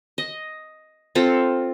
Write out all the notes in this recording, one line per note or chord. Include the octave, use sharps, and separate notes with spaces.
D#5
C4 F4 A4